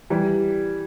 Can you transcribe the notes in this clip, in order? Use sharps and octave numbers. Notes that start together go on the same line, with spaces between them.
E3 G3